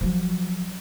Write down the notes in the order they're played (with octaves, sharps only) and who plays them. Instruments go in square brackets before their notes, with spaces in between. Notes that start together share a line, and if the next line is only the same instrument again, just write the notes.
[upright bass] F3 F#3